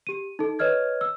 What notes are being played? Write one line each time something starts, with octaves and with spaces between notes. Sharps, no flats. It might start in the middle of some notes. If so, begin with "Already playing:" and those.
G4 D#7
D#4 A4
B4 C#5 D#5 F6 G#6
E6